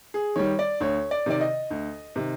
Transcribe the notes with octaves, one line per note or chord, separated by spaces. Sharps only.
G#4
D#3 G3 C#5
D5
D2 C#5
D5
C3 D#3 D5
D#5
D2
C3 D#3